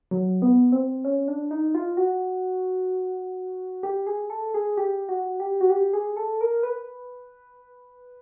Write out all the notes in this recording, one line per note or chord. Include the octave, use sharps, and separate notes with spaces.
F#3
B3
C4
C#4
D4
D#4
F4
F#4
G4
G#4
A4
G#4
G4
F#4
G4
F#4
G4
G#4
A4
A#4
B4